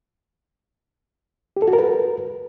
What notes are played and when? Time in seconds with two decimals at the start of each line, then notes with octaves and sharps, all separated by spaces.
1.57 G4
1.62 A4
1.68 F#4
1.73 A#4
1.79 B4